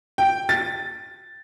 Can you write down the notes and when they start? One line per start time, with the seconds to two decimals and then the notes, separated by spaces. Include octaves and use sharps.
0.18 G5
0.49 A6